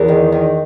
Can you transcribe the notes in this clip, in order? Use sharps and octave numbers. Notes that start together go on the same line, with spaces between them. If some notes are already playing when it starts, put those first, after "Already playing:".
Already playing: E2 A#4
D#3
D#3